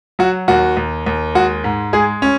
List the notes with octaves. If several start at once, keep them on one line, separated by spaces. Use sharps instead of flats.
F#3 F#4
D#2 F#4
D#2
D#2
G#3 F#4
G#2
G#3 G#4
C#4